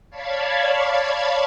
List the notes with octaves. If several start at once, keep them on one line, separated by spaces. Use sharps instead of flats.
C#5 D5 F5 A5 B5 G#6